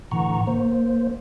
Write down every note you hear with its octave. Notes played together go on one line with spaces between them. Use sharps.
A2 D3 E3 F#5 A#5 C#6
A#3 C5